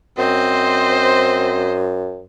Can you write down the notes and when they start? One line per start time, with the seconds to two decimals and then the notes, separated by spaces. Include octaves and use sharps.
0.18 F#2 C4 C5 D#5